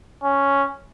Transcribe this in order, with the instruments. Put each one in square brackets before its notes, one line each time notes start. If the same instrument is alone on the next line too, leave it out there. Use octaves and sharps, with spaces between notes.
[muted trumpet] C#4